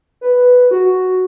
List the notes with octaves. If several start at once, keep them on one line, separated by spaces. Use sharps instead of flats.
B4
F#4